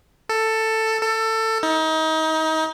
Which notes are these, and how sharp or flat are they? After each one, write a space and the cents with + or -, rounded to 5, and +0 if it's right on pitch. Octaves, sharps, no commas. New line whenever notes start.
A4 +10
A4 +20
D#4 +30